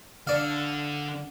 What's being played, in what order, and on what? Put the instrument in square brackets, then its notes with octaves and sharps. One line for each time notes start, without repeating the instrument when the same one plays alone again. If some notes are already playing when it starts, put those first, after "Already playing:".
[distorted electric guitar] D3 [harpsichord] D5 F5